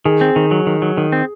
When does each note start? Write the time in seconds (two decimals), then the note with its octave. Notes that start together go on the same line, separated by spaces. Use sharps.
0.05 D#3 G#4
0.21 C4
0.36 D#3
0.51 F#3
0.67 D#3
0.82 F#3
0.97 D#3
1.12 C4